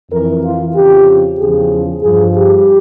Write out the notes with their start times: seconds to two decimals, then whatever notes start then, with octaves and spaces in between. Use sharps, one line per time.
0.11 F2 E3 A#4
0.43 F4
0.76 F2 C#3 F3 G4
1.39 E2 C#3 F3 G#4
2.02 G2 F3 G#4
2.35 G4